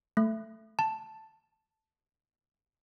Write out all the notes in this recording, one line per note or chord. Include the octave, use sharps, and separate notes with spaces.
A3
A5